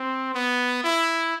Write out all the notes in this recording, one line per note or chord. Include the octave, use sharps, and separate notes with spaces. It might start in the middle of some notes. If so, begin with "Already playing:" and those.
Already playing: C4
B3
E4